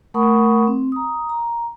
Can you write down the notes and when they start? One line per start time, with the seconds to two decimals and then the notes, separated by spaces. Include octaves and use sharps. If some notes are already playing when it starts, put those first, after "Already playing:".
0.14 A3 A#4 F#5 B5 C#6 D#6
0.67 C4
0.92 A#5 D#6
1.29 A#5